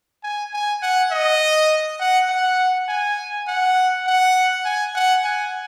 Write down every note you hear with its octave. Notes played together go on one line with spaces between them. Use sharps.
G#5
G#5
F#5
D#5
F#5
F#5
G#5
F#5
F#5
G#5
F#5
G#5